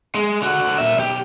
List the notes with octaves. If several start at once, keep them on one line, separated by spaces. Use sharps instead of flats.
G#3
D3 F#4
A#2 E5
B1 G4